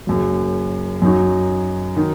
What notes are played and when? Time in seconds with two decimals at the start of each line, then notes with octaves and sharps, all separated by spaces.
0.07 F#1 F#2 F#3
1.02 F#2 F#3 D#4 F#4
1.97 D#3 F#3 D#4